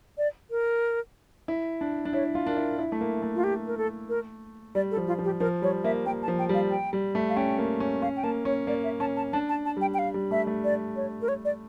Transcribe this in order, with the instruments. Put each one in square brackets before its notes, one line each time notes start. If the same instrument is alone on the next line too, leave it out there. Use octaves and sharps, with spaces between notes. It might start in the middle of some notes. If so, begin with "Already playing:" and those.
[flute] D5
A#4
[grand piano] E4
D4
D4
[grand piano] E4 [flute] C#5
[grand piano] F4
[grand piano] D4 [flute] A#4
[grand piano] E4
E4
A3
A#3
A3
[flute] F4
G4
A#4
A4
A#4
[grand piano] G3 [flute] D5
[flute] A4
[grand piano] F3
[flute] F4
[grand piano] F3
[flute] G4
[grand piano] F3 [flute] A#4
[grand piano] G3 [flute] C#5
[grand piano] A#3 [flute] E5
[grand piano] A#3 [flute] G5
[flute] A5
[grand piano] F3
[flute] G5
[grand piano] G3 [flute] F5
[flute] G5
[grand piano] G3
A3
[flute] F5
[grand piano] C#4 [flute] G5
[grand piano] A#3
C#4
[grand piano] C#4 [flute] F5
[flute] G5
[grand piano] A#3 [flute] A5
[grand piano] C#4 [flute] C#5
[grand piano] A#3 [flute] D5
[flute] E5
[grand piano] C#4 [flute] A5
[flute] A5
[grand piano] D4 [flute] A5
[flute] A5
A5
[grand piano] G3 [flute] G5
[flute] G5
F5
[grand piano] G3
[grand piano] A3 [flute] E5
[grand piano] A3
[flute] D5
C#5
A#4
C#5
D5